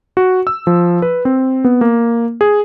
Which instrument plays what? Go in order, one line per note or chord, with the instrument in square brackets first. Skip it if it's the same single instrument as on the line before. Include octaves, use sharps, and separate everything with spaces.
[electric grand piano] F#4
E6
F3
B4
C4
B3
A#3
G#4